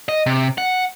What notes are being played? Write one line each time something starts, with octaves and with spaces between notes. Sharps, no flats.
D#5
C3
F#5